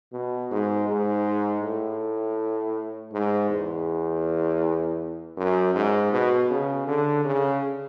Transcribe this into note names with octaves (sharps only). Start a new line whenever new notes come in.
B2
G#2
G#2
A2
G#2
E2
F#2
G#2
B2
C#3
D3
C#3